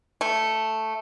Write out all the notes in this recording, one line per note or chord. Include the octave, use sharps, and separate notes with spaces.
A3